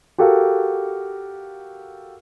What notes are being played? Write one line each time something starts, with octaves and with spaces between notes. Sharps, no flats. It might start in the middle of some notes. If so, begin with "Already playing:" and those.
F#4 G4 A4 A#4 F5